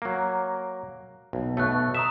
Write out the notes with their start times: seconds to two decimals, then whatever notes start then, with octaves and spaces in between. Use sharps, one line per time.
0.02 F#3 A#3
1.33 B1
1.57 B1 B2 A3 C#6 F#6
1.95 E5 A#5 D#6 E7